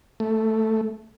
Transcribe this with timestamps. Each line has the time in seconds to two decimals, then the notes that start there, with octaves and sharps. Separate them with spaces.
0.20 A3